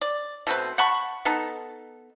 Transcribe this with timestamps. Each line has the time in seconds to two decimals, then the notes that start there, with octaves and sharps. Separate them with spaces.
0.01 D5
0.47 B2 A3 C4 B4
0.78 F#5 A5 B5 C#6
1.25 B3 D#4 A4